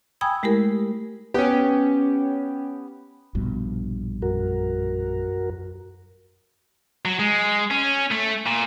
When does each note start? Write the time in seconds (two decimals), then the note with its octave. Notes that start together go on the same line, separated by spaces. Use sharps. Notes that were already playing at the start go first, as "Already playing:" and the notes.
0.21 G5 G#5 B5 D#6 E6 G#6
0.43 G#3 A3 E4 G4 A#4
1.34 B3 C#4 G4
3.35 A#1 G2 B2
4.22 F#2 F#4 A#4
7.05 F#3
7.19 G#3
7.71 C#4
8.12 A3
8.46 A#2